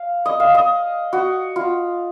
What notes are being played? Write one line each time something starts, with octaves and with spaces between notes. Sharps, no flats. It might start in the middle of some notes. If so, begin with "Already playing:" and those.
Already playing: F5
D#5
F5
D#5
F#4
F4